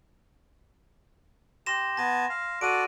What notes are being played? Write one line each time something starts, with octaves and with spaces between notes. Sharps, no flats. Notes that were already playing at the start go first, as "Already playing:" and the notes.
G4 C6 A#6 E7
B3 G#5 A5 A#6
F5
F#4 A4 D5 D7 D#7